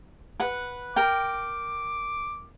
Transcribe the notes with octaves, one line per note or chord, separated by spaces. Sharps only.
B4 F#5
A#4 G5 D6